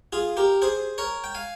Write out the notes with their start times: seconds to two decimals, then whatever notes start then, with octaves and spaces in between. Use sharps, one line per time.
0.13 F4 G#4
0.37 G4 A#4
0.62 G#4 C5
0.98 A#4 C#5
1.24 G5
1.34 F5 G#5